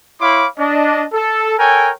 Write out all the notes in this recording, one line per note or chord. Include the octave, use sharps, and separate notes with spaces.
E4 C#5 F5 B5 C6 D6
D4 D#5
A4
A4 A#4 C#5 G5 G#5